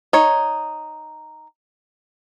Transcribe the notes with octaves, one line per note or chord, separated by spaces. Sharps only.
D#4 C#5